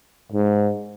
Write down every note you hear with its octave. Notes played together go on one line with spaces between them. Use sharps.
G#2